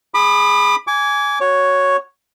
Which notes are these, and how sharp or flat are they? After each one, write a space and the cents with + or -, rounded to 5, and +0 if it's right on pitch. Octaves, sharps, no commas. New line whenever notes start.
G#4 +0 B5 +0 D6 +40
G#5 +0 D6 -30
F#4 +0 C#5 +0